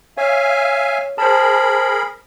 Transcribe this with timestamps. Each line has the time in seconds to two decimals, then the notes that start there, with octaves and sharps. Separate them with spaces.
0.18 C#5 E5 F5 G#5
1.18 G#4 A#4 C5 A5 B5